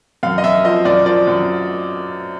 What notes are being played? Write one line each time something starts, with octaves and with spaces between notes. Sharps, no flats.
F#2 F5
D#5
F#2 E5
F3 D#5
F#2 D5
F3 D5
F#2